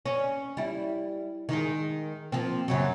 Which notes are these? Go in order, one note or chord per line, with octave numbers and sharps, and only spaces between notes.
C#4
G3 E4
D#3 G#3
F3 A#3 C4
F#2 C#3 F#3